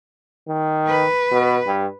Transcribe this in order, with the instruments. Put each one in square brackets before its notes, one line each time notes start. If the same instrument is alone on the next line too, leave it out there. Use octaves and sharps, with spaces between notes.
[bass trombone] D#3
[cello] B4
[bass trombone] B2
G2